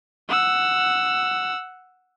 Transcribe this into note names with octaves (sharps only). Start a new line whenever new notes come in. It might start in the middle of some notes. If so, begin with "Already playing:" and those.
F#5 E6